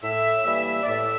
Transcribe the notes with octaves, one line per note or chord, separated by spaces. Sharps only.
A2 E5
E3 G3 A#3 E5
D5
A2 E5